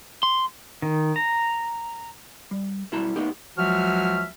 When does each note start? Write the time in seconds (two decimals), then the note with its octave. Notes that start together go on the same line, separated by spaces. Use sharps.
0.23 C6
0.82 D#3
1.16 A#5
2.51 G3
2.92 B1 G3 E4 F#4 A5 A#5
3.16 A3 B3 D#4 G4
3.57 C#2 F3 F#3 F#4 E5 F6